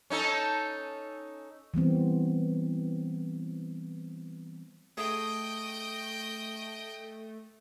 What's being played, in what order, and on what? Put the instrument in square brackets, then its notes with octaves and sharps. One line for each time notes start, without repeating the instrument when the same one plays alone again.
[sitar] C#4 D#4 A4
[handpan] E3 G3 B3 C4
[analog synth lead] A3 [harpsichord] G#4 [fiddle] D#5 G5